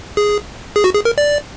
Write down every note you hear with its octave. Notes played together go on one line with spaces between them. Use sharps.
G#4
G#4
F#4
G#4
A#4
D5